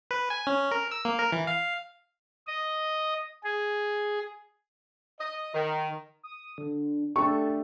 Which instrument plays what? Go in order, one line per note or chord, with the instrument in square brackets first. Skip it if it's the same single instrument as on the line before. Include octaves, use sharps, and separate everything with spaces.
[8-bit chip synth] B4
G#5
C#4
A#4
E6
A#3
A#4
E3
F5
[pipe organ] D#5
G#4
[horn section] D#5
D#3
[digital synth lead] D#6
D3
[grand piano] A3 D4 G4 [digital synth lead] A4 [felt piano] C#6